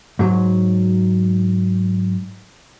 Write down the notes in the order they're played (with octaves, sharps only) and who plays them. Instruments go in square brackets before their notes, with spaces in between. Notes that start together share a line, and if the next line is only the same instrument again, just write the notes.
[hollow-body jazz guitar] G#2 F#3